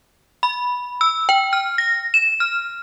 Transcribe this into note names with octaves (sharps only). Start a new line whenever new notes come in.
B5
E6
G5
F6
A#6
E7
F6